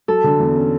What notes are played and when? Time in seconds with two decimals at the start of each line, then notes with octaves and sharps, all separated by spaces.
0.08 F#3 A4
0.24 D3
0.40 E2
0.56 C#4